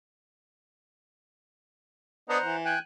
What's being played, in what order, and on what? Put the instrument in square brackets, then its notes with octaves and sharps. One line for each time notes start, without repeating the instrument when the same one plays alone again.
[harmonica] B3 D4 D#5 [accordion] C5 F#5 A#5
[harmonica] E3
[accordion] G5 G#5 F#6